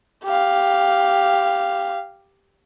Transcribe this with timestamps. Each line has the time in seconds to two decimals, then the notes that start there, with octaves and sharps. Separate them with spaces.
0.25 G4 F5